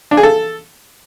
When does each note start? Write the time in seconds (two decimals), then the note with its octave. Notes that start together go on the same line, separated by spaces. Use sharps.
0.11 D4
0.17 G#4
0.23 A4